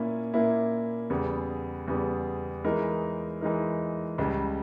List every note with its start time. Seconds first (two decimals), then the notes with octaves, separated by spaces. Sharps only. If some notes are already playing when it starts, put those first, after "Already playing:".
Already playing: A#2 A#3 C#4 E4
0.34 A#2 A#3 C#4 E4
1.10 E2 C#3 G3 B3
1.88 E2 C#3 G3 B3
2.64 E3 G#3 D#4 A#4
3.41 E3 G#3 D#4 A#4
4.18 C#2 C#3 G3